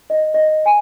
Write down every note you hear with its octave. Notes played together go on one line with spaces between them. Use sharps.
D#5
D#5
G#5